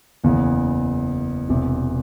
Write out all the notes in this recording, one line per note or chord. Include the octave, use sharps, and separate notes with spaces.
F#1 E2 C#3 E3
E1 E2 C3